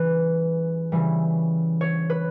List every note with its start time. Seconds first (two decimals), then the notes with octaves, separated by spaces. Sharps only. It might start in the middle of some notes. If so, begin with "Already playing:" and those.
Already playing: C#3 E3 G3 B4
0.92 C#3 E3 G3
1.81 C#5
2.10 B4